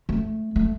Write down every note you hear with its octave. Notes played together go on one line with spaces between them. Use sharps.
A3
A3